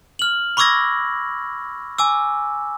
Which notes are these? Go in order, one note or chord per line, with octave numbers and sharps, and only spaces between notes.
F6 F#7
B5 C#6 D6 E6 G#6 A#6
G#5 D6 E6